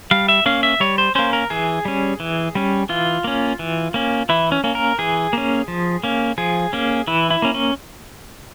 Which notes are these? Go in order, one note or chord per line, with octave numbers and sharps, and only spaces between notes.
G3 F5
E5
A#3 C#4 F5
E5
G3 C#5
C5
A#3 C#4 C5
A#4
E3 G#4
G3 C#4
E3
G3 C#4
E3 F4
A#3 C#4
E3
A#3 C#4
E3 E4
C#4
A#3 C#4
A#4
E3 G#4
A#3 C#4
F3
A#3 C#4
F3 G#4
A#3 C#4
E3 E4
E4
A#3 C#4
C#4